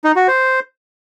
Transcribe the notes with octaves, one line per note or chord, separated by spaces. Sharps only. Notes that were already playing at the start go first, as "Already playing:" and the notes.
D#4
F#4
C5